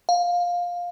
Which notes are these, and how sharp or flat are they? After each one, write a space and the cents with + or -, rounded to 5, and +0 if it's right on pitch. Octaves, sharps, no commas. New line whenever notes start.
F5 +10